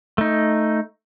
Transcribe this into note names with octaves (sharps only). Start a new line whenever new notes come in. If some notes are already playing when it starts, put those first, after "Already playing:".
A3 D#4